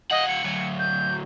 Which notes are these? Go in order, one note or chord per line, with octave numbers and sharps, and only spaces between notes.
F3 D#5 F#5
C#7
D2 F#3
G6